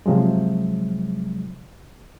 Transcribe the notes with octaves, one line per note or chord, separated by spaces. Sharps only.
C3 F3 F#3 G#3